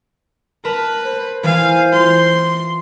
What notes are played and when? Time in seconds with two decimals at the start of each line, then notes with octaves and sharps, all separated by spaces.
0.65 A#4 B4 A5 B5
1.05 C5
1.43 E3 F5 G#5
1.92 F4 C6